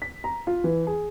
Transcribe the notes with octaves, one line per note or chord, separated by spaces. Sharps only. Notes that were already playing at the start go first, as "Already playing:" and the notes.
B6
A#5
F4
E3
G#4